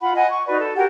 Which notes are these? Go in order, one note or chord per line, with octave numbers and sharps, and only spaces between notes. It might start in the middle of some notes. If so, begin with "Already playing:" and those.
F4 F#5 B5
D#5 F#5 G#5
C#6
D#4 F#4 B4 D5
A4
F#4 G4 A#4 F#5